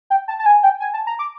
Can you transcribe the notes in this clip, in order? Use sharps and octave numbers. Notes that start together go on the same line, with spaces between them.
G5
A5
A5
G#5
G5
G#5
A5
A#5
D6